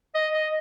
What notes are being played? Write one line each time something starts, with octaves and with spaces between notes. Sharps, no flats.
D#5
D#5